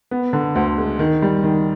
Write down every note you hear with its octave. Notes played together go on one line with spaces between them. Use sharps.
B3
D3
D2
G#3
D#3
G3
D#3